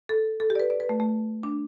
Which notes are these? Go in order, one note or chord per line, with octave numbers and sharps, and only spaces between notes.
A4
A4
G4
D5
B4
D5
B4
A3
A3
D4